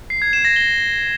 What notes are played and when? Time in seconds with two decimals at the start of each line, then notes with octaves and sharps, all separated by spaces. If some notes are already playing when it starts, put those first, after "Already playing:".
0.10 C7
0.22 G#6
0.33 E7
0.45 A#6
0.56 G7